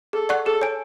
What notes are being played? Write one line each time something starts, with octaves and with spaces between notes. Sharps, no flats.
G#4 A4
D5 F#5 C#6 F#6
G#4 A4
C#5 G#5